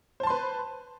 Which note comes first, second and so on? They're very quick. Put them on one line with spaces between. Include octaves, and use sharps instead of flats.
C5 A5 C6 B4